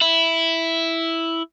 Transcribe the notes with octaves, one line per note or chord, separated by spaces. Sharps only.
E4